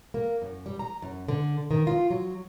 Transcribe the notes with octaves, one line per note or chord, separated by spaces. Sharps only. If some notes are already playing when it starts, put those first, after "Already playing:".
A#3
F#2
G3
A#5
F#2
D3
D#3
F4
F#3